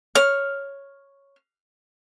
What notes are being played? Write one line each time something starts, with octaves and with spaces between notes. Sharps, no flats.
C#5 F6